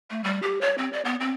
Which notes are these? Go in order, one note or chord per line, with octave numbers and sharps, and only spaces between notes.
A3
G3
G4
C#5
C4
D5
B3
C4